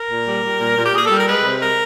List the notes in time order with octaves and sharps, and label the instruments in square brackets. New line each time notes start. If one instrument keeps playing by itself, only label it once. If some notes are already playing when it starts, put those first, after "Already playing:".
Already playing: [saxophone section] A#4
A#2
G3
G3
A#2
A#2
G4
A#2 G#4
G3 A4
A#4
G#3 B4
C3
A#4